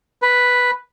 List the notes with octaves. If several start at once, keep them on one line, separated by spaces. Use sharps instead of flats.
B4